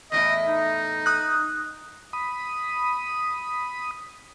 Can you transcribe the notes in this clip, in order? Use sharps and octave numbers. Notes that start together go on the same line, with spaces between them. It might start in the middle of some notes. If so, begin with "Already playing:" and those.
E2 A2 E4 D#5
D#4
D#6 F#6
B5 D#6